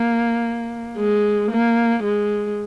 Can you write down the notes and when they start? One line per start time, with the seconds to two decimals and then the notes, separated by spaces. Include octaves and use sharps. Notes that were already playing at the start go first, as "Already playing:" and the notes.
Already playing: A#3
0.98 G#3
1.51 A#3
2.03 G#3